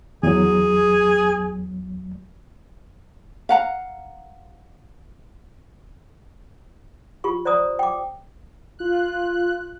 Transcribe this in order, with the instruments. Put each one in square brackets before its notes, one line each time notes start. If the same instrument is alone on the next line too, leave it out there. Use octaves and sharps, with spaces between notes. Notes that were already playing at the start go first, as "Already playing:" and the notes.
[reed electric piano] E2 F#3 [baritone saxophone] G#4
[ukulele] F5 F#5 A#5
[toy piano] F4 G4 C#6
C5 D5 A#5 D#6 E6
G5 D6
[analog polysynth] F4 F#6